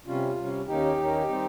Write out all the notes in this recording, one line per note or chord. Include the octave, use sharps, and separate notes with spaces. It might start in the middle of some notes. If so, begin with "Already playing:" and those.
C3 G3 C#4 F4
C3 G3 C#4
D#2 D#3 A#3 C#4 D#4 G4
D#2 D#3 A#3 C#4
D#3 G3 C4